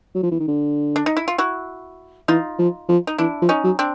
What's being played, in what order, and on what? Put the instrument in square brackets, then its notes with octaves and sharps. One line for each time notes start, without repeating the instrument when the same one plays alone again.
[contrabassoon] F#3
F3
E3
D#3
D3
[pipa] D4
D#4
E4
F4
E4 F#4
[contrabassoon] E3 [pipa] D#4 F4
[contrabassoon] F3
F3
[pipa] D#4
[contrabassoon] E3 [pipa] D4 E4
[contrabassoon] F3
[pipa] C#4 D#4
[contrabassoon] F#3
[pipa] C4 D4